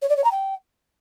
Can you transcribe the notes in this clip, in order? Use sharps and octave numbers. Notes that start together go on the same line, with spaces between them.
C#5
D5
C#5
A#5
G5